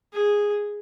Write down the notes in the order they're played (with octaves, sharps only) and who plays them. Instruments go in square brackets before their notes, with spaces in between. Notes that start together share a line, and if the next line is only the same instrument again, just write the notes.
[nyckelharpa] G#4